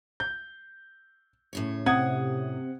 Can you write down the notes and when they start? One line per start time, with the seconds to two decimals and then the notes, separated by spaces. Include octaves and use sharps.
0.20 G6
1.53 A2 C#3 C#5
1.86 C3 F#5 D#6 G#6